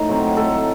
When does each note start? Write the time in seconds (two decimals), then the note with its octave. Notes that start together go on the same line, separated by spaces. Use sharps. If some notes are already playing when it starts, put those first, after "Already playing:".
Already playing: A2 D#4 C5
0.09 F#3 C4
0.37 A2 A4